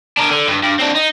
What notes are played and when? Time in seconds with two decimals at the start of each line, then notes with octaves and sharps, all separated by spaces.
0.17 D4 A#4
0.29 D3
0.48 G2
0.63 G2
0.79 C4 D4
0.95 D#4